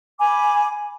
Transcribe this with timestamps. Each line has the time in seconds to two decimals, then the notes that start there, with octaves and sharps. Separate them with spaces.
0.19 G#5 B5 D6